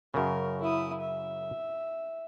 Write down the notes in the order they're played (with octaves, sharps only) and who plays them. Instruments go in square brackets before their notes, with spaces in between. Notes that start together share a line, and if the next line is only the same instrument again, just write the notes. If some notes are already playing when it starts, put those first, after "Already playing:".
[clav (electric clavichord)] F#2 C#3 [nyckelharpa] A#4
[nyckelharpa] E4 D#6
E5